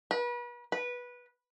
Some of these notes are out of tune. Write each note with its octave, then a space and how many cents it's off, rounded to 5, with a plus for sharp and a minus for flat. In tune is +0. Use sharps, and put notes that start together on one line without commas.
B4 -35
B4 -15